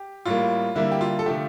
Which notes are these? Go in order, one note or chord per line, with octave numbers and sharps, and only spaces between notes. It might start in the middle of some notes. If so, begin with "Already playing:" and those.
Already playing: G4
A2 G3 A#3 F4
D3 G3 A#3 E4
G4
F4
A4
D3 F3 A3 G4